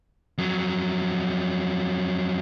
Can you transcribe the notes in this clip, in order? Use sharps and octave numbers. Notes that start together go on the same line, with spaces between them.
F2 F#3